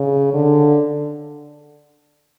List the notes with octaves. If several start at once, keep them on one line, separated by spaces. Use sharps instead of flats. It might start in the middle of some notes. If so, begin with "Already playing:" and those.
Already playing: C#3
D3